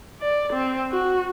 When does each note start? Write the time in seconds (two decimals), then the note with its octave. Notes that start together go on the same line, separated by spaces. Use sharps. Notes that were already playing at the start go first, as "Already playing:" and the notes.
0.20 D5
0.53 C4
0.90 F#4